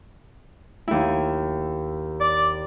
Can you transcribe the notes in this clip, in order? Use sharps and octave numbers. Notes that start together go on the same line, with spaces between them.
D#2 E4
D5